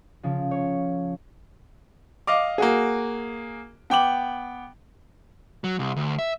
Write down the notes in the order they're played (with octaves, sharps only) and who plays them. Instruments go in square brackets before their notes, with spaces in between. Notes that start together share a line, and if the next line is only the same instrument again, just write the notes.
[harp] C#3 F3
C#5
[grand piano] D#5 F5 D6
A#3 F#4 G#4
B3 G5 D6 F#7
[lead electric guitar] F#3
C2
D2
E5